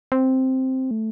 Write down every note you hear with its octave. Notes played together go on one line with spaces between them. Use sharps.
C4
A3